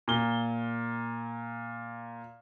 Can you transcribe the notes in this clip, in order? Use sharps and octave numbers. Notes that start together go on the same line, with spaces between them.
A#2 G7